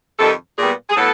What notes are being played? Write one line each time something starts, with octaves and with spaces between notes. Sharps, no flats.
F2 C3 D#3 G3 A4
A#2 G3 B3 G#4
G#4
A2 F#3 B3 A4